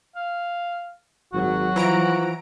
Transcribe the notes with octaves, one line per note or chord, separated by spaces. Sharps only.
F5
G#1 F#3 F#4
E3 F3 A#5 D7